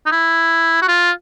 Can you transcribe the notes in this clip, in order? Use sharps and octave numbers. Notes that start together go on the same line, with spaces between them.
D#4
E4
F#4
F4